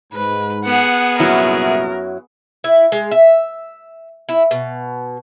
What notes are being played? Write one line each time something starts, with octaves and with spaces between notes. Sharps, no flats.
G#2 B4
B3 G#4 F#5
C2 F#2 A#2 F#3 E4 A#4 E5
E4
G#3
E5
E4
B2